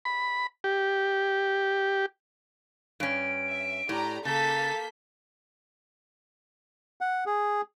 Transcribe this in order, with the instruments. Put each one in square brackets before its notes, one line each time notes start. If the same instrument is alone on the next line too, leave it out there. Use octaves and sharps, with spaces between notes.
[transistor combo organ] B5
G4
[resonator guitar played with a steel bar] G2 C#4 [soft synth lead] D7
[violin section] E5
[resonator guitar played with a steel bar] A2 [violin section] G4 D5 A#5
[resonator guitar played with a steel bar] C#3 [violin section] A#3 G6 B6 [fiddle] A4 [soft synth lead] A6
[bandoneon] F#5
G#4